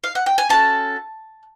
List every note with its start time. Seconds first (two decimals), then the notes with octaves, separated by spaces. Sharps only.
0.04 F5
0.15 F#5
0.26 G5
0.38 G#5
0.49 C#4 F#4 A4 A5